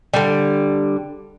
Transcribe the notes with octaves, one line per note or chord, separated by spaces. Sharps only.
D3 G3